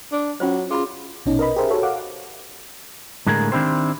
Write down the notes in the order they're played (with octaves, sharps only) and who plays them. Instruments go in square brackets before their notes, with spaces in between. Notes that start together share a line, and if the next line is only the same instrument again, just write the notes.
[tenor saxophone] D4
[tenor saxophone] F#3 [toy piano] C#4 F4 C5
[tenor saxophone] F4 [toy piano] G#4 B5
[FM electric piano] A#1 B2 C#4 D#4
A#4 B4 D#5 B5
G4 G#4 A#4 C5 E5
F#4 A4 C#5
F5 F#5 D6
[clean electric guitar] A2 D3 G#3 A#3 G#4 A#4
D#3 C4 D4 E4 G4 C5